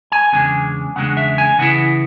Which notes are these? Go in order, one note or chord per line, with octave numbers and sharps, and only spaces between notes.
G#5
E2 C#3 G#3 D4 G#5
E2 C#3 G#3 D4 F#5
E5
G#5
C#3 E3 B3 E4 F#5